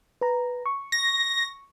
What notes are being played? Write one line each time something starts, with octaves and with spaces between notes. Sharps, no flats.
B4 A#5
C#6
A#6